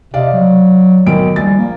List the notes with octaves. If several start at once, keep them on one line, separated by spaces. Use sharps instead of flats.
C3 D5 D#5 F5
F#3
B1 D#3 D7
A#1 G3 G#5 A6
A#3